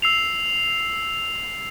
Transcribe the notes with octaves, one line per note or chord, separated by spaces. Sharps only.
E6 C7 F7